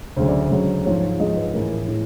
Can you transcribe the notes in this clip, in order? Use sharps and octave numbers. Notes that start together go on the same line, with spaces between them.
D2 C#3 F#3 C5
D5
C5
D2 C#3 F#3
G#2 F3 G#3 C#5
G#2 F3 G#3 D#5
B4
A2 E3 G#3 A#4
A2 E3 G#3